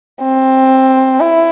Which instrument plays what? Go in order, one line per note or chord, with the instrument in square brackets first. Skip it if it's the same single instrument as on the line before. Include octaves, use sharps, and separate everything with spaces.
[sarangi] C4
E4